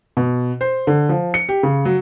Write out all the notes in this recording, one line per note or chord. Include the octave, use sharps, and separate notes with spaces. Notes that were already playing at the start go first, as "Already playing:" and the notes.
B2
C5
D3
F3
C#7
G4
C#3
F#3